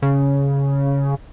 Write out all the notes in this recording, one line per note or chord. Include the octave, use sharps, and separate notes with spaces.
C#3